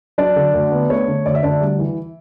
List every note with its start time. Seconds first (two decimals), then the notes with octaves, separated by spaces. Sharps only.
0.18 F#3 D4 D5
0.36 D3
0.54 D2
0.72 B3
0.90 A3 C#5
1.08 D3
1.26 D2 D5
1.35 E5
1.43 D2 D4 D5
1.61 G3
1.79 E3